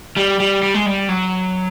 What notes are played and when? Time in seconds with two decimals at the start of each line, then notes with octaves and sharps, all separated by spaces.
0.17 G3
0.40 G3
0.63 G3
0.74 G#3
0.86 G3
1.09 F#3